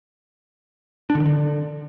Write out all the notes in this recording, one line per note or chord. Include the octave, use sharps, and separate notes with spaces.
D4
D3
D#3
D3